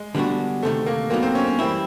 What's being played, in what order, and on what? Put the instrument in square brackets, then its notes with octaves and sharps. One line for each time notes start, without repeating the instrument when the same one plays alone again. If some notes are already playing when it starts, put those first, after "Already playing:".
Already playing: [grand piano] G#3
[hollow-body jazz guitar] D3 G3 B3 D4 F#4
[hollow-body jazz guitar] D2 C3 D#3 [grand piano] A3
[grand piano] A#3
[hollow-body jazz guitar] A#2 F#3 B3 D#4 [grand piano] A#3
[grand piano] C4
C#4
C#4
[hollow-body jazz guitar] E3 G3 C4 E4